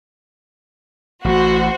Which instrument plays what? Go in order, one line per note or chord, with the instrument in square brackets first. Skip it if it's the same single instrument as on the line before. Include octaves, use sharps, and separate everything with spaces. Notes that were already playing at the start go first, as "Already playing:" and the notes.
[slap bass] A1 A2 [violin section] F#4 C5